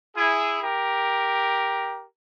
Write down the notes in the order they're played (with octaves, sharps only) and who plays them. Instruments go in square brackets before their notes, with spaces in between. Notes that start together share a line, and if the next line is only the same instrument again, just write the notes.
[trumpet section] E4 G#4
G4 A#4